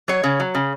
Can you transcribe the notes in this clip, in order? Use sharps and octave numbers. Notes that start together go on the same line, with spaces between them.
F#3 C#5
C#3
F#3
C#3